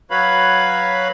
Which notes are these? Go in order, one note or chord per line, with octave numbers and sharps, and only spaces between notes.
F#3 F#4 B4 C#5 F5 B5